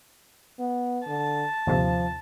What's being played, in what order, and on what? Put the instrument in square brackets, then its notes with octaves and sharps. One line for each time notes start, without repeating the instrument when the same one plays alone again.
[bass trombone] B3
[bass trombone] D3 [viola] A5
[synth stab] G1 D#2 C3 [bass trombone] F3